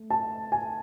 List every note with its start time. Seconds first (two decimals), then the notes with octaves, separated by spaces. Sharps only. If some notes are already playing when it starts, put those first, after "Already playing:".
Already playing: A3
0.10 A5
0.52 G#5